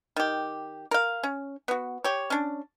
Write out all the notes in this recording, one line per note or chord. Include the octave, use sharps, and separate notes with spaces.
D#3 G4
A#4 F5
C#4
B3 F#4
G4 C#5
C#4 D4